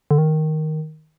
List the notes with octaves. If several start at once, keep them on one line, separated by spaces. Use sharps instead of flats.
D3
D#3